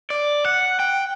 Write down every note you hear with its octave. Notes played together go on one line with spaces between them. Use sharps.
D5
F#5
G5